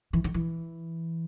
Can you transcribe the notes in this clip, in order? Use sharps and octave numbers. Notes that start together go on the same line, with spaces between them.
E3
D#3
E3